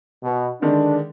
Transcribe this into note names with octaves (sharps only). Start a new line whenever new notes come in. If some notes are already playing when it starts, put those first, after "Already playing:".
B2
D3 D#3 G#3 D4